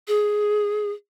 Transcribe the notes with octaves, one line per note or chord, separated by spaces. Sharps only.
G#4